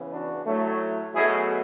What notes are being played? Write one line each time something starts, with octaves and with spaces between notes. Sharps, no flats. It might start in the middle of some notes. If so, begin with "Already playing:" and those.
Already playing: C#3 E3 B3
D4 F#4
A2 F#3 A3
B2 F#3 A3 E4 G#4